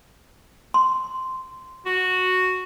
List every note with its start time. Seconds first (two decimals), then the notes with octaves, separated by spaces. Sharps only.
0.74 C6
1.86 F#4